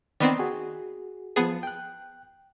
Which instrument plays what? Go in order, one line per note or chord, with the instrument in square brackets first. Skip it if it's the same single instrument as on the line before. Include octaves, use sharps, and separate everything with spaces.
[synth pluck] D#3 B3 C4 [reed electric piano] D5 B5 D#6
[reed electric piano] F#4 G#4
[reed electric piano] F3 A5 [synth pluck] B3 G#4
[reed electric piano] G5 F#6